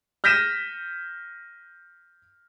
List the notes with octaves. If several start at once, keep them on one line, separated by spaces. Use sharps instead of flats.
F6 G6 A#6 B6 D#7 E7